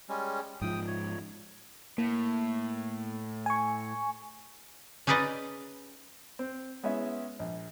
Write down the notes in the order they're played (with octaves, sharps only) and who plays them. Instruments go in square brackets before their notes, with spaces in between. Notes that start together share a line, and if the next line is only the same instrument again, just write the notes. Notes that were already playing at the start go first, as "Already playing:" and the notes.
[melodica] G3 G#3 C#4
[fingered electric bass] G#2 F3 [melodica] G5 D#6
[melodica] C#5
[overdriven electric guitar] A2 [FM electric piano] A#3
[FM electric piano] G#5 C#6
[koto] C#4 D#4 G#4 B4 D5 D#5
[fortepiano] C4
G#3 B3 C#4 E4 E5
A#1